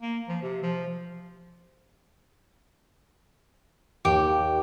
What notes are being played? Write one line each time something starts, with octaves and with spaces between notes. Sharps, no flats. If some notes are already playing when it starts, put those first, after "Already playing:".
A#3
F3
C3
F3
D#2 G4